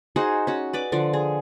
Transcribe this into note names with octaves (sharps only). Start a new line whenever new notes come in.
D#4 F#4 G#4 C5
C#4 F#4
B4 D5 D6
D3 F3 D5
G#4